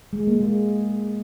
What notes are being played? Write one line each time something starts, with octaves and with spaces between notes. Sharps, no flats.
G#3
A#3
G#3